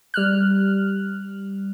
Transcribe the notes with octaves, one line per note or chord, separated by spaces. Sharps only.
G3 F6 F#6